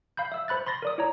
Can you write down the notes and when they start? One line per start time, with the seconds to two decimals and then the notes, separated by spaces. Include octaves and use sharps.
0.17 F5 B5 G6
0.32 E5 E6
0.48 C5 B5 F#6 A6
0.66 B5 C6 A6 A#6
0.82 A#4 D5 D#6
0.98 E4 C#5 A#5